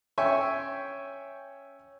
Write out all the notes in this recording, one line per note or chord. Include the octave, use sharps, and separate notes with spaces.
C#4 E5 G5 G#5 C#6